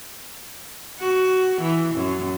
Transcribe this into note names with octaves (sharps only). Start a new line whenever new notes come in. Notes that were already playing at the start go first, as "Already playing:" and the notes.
F#4
E3
F#2